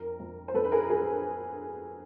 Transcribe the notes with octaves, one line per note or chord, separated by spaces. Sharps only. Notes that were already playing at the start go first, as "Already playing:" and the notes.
Already playing: F2 A#4
F2
C5
F2 A4 B4
B4
G#4 A#4
F#3 G#4 A#4